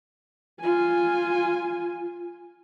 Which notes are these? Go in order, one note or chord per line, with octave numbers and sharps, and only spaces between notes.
F4 G#5